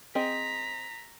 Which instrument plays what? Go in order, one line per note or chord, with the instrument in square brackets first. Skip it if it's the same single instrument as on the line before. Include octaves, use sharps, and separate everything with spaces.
[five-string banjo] C4 G#4 D#5 [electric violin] A#5 B6